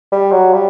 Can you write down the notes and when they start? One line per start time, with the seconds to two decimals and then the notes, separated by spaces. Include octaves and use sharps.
0.12 G3
0.32 F#3
0.54 G3